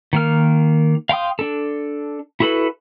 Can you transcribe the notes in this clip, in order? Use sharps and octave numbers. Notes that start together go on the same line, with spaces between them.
D#3 A#3 F6
F5 G5 C6 D#6
D4 A4
E4 F#4 A4 B4